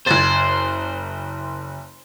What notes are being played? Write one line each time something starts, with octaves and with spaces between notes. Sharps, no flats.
F#1 C5 G#6 A6